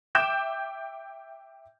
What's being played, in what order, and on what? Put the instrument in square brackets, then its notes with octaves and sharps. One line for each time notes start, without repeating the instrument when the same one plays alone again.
[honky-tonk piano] E5 G5 D6 G6 E7